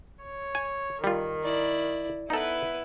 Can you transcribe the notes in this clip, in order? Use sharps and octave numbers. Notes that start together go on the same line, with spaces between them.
C#5
G#5
D#3 G3 F4
E4 D5
B3 D#4 E4 A4 B4